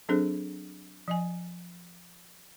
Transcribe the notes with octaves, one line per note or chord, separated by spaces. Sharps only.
F#3 C4 D4 G#4 A4 C5
F3 D#5 G#5